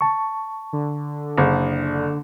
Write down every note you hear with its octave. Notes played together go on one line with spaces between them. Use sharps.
A5 C#6
D3
F#1